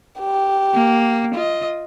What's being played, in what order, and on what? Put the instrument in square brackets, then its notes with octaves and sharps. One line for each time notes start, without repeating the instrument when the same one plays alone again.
[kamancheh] G4
[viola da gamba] A#3
F4 D#5